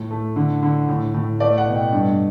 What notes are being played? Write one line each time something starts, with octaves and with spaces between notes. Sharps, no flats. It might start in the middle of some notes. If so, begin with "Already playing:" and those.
Already playing: A2
A3
D3
D3
A2
A2
A3 D5
F#5
B2
G5
G2